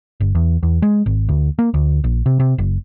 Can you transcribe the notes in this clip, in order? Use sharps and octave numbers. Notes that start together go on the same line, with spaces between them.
G1
E2
E2
G#3
G#1
D2
A#3
D2
A#1
C3
C3
F#1